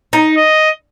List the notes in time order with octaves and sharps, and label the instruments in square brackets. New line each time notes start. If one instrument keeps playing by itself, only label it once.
[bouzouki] D#4
[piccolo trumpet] D#5